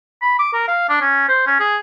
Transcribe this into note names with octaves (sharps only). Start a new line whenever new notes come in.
B5
D6
A#4
F5
D4
C#4
C5
C#4
G#4